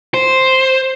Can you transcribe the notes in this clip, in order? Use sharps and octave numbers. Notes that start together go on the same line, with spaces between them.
C5